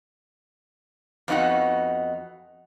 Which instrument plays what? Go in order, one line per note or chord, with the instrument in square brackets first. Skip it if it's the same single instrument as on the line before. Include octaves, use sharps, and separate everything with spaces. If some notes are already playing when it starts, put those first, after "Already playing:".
[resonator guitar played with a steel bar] F2 B3 D#4 F#4 F#5